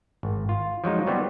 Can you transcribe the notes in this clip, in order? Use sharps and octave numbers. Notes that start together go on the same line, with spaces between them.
G#1
F4
F3 F#3 G#3 D#4
F#3 G3 B3 C4 F#4